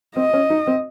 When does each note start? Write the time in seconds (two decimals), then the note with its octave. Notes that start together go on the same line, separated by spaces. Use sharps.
0.16 C4 D#5
0.33 C#4
0.50 D#4
0.67 C4